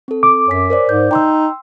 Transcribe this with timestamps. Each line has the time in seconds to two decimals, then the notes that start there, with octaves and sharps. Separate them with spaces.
0.08 C4 A4
0.23 D6
0.48 F#2 C#5 G#5 B6
0.70 A#4 C5 D5
0.89 G#2 G6
1.11 D#4 G5 C6 E6